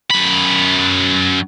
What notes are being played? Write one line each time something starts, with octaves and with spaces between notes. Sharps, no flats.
F#2 B5